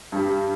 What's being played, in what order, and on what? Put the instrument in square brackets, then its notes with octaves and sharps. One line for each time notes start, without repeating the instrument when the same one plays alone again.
[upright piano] G2 G3